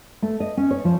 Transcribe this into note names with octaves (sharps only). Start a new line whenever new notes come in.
A3
D#5
C#4
C#5
F3